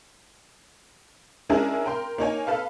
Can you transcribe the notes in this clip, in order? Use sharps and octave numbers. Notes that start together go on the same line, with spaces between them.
G#3 C#4 D4 E4 G#4 A#4
A#4 G5 C6
A#3 D#4 C#5 G#5
A4 B4 F5